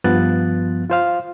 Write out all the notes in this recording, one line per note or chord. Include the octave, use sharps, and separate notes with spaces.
G2 F3 B3 F4 F#6 A6
F4 C5 F5